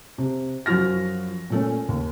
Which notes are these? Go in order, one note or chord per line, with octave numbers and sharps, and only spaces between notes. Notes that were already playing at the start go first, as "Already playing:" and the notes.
C3
F#2 F3 F4 F#4 F6 A#6
A#2 A3 C#4
D#2